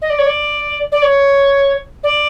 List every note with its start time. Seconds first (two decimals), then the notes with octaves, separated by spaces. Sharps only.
0.02 D#5
0.10 D5
0.18 C#5
0.26 D5
0.92 D5
1.02 C#5
2.03 D5